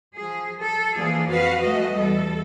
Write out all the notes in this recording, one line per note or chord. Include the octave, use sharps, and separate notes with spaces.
F3 G#4
A4
E3 F3 A#3 D4 G#4
F2 F#4 B4 F5
G#3 A3 F#4 D#5
E2 G3 A4